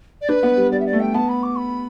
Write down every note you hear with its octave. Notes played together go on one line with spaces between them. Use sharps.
D5
D4 B4
B3
G3
G3 D5
E5
D5
A3
G5
B3 A5
B5
D6
B5